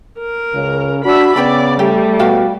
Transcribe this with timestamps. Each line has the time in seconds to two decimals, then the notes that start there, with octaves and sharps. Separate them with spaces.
0.18 A#4
0.54 C#2 C#3
1.05 D4 F#4 E5 B5
1.36 C#3 B3 C#5 D5 G5 B5
1.79 G3 A3 G4 G5
2.19 B2 F#4 F5 G5